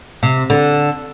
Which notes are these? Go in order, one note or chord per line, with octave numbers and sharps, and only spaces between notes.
C3
D3